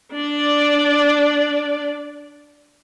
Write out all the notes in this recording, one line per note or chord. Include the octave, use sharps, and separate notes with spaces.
D4 D5